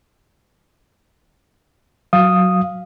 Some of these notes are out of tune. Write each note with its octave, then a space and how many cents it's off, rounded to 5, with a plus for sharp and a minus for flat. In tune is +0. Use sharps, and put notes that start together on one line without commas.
F#3 +0 F5 +0 D#6 +0